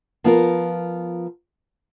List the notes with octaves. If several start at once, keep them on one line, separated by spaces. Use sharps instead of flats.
F3 B3 F4 A#4